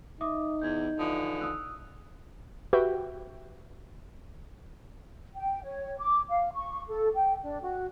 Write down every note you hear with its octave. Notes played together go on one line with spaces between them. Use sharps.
D#4 E5 D6 D#6
E2 G6 G#6
D3 E3 F3 D#6
D#6 E6 F#6
F#4 G4 B4 E5 G5
G5
C#5
D6
F5
C#6
A4
G5
D4
F#4